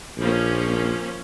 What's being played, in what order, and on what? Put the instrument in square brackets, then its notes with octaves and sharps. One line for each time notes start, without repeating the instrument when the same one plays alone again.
[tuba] A#1 [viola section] F3 A#3 C#4